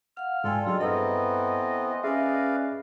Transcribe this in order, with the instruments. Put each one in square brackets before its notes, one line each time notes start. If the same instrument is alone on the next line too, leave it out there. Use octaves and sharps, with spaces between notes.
[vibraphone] F5 F#5 [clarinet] F6
[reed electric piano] G#2 F5 G#5 [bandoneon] F4 A4 [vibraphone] D5 G5
[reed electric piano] F#3 D4 [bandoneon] F4 A4 [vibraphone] G#4 D#5
[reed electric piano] G2 [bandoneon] E3 B3 C4 [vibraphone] A4 A#5 B5 [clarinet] D#5
[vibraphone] C#4 G#5 [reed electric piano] G#4 E5 [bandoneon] B4 D5 F5